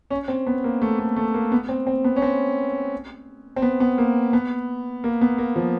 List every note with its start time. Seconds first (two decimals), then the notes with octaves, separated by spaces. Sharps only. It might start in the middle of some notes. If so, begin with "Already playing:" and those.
0.10 C#4
0.28 C4
0.46 B3
0.64 A#3
0.82 A3
0.99 A3
1.16 A3
1.34 A#3
1.52 B3
1.69 C4
1.87 C4
2.04 B3
2.16 C#4
2.22 C4
3.56 C4
3.62 B3
3.80 B3
3.98 A#3
4.33 B3
5.04 A#3
5.21 B3
5.38 A#3
5.56 F3